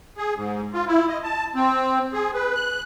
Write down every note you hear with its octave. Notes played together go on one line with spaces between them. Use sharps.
G#4
G#2
F4
E4
D#5
A5
C4
G#4
B4
F#6